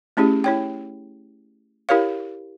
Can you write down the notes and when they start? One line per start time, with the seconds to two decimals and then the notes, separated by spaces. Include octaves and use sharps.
0.17 A3 C#4 E4 G4 G#4
0.44 E4 C#5 G5
1.89 E4 G4 A#4 C#5 F5